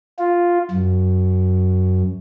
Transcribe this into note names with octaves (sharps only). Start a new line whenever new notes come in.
F4
F#2